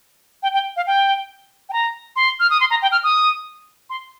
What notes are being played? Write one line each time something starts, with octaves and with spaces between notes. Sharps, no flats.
G5
G5
F5
G5
G5
A#5
C6
F6
D#6
C6
A#5
G5
F6
D#6
C6